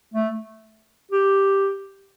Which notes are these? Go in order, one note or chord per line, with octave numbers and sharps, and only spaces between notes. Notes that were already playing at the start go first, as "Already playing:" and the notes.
A3
G4